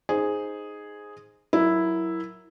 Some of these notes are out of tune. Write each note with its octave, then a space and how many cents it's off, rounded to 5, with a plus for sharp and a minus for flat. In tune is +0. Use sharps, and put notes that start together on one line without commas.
D#4 +0 G#4 +0 C5 +0
F#3 +0 E4 +0 A#4 +5